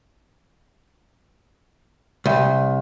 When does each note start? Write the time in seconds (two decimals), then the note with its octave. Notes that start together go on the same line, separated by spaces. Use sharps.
2.26 C2